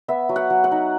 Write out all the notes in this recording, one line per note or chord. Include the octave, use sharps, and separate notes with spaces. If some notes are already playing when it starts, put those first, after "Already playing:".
B3 E5
F#3
F#5
F#3
F#5
D#4